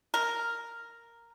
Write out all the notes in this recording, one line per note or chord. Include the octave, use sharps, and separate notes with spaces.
A#4